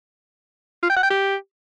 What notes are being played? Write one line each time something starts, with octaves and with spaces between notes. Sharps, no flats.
F4
G5
F#5
G5
G4